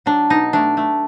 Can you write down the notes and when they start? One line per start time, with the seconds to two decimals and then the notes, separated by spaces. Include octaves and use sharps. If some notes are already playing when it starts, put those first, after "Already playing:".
0.06 F#3 D4
0.30 B2 D#4
0.53 A3 D4
0.77 A3